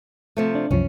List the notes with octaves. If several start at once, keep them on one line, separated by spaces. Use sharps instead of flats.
C3 F3 A3
D4
C2 F#2 F3 C#4